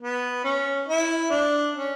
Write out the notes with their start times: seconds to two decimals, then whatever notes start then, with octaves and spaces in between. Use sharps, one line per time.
0.01 B3
0.44 C#4
0.88 E4
1.30 D4
1.74 C#4